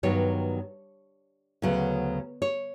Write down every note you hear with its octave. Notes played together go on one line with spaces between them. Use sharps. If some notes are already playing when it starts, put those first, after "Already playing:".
G2 D#3 F#3 B3 C#5
D2 C#3 F#3 B3
C#5